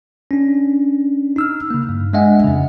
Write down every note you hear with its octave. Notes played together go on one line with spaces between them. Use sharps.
C#4 D4
D#4 E6 F6
C#3 A#3
G2
G#3 D4 D#5 E5 F#5 G#5
F2 C#3